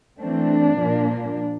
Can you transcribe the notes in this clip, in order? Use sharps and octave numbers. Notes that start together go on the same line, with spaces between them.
E3 A3 C4 D4
A#2 F3 A#3